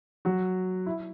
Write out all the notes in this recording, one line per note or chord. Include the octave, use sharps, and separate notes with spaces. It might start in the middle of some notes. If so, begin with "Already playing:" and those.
F#3 F#4
E4